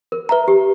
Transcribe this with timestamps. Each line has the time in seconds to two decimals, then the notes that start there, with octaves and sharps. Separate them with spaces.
0.12 A#4
0.29 B4 E5 A#5
0.48 G4